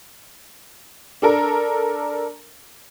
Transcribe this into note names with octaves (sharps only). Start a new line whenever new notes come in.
D4 A4 A#4